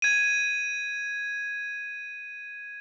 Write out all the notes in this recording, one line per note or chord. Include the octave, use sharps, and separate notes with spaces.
G#6 D#7